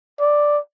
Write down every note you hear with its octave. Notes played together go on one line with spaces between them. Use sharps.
D5